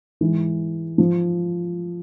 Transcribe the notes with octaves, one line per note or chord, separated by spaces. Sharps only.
G#2 E3
F3